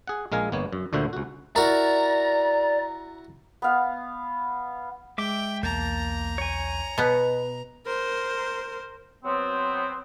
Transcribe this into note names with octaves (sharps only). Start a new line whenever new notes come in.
G#4 F#5
A#1 G#3 A#4 F5 G#5
G1 A#3 B3 C#5
F#2
D2 A#2 D3 F#4 C5 E5
C#2 F#4
E4 F#4 A#4 D5 A#5
B3 F5
G#3 E5 G5 D6
B1 E2 A#3 A5 A#5 G6
C#5 G#5
B2 B3 D#5
A#4 C5
F#3 B3 C4